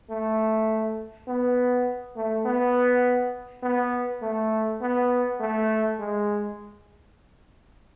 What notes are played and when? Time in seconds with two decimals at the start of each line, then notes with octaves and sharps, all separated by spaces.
0.10 A3
1.27 B3
2.16 A3
2.45 B3
3.63 B3
4.22 A3
4.81 B3
5.40 A3
5.99 G#3